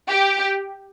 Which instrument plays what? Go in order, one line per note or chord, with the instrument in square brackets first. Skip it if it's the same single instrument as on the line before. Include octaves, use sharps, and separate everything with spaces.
[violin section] G4